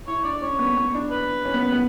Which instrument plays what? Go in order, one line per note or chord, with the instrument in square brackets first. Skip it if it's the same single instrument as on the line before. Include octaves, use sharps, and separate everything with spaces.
[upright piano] E4 [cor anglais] C#5
[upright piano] D4 [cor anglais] D5
[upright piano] C#4 [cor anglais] C#5
[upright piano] B3
B3
D4
[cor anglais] B4
[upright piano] C#4
B3
B3